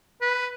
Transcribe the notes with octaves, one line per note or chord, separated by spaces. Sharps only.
B4